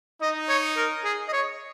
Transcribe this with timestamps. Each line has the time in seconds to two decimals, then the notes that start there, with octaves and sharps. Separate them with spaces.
0.21 D#4 D#5
0.49 C#5
0.77 A#4
1.05 G#4
1.28 D#5
1.33 C#5